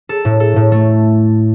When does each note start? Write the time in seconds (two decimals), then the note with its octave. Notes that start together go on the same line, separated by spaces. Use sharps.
0.09 A4
0.25 A2
0.40 A4
0.56 A2
0.72 A3